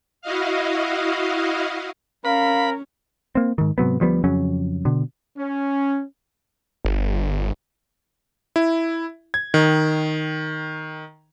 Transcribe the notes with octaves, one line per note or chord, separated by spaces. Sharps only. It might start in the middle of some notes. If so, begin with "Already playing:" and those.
E4 F#4 D#5 F5
C#4 A#4 F5 B5
A#3 C4
G#2 D#3
G#2 C3 F#3 B3
D2 F3 G3 B3
F2 C#3 F#3 C#4
B2 D3
C#4
G1
E4
G#6
D#3